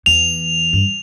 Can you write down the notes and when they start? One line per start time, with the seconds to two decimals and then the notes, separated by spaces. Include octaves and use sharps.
0.06 E2 F7
0.73 G2